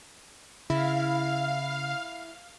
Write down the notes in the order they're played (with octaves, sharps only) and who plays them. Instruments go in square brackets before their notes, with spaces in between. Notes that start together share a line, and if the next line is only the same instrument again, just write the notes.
[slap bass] C#3 [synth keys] E4 [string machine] F5